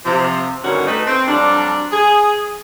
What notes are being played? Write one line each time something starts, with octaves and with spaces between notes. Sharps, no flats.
C3 F3
G2 A#2 D3 D#3 C#4 F#4
A3 D#4 B4
C4
F2 F#3 G3 D4
G#4